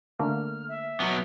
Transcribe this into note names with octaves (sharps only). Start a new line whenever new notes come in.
D3 A3 A#3 F6
E5
F#3 B3